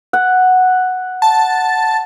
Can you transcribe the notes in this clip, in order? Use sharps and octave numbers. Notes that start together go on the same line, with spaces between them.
F#5
A5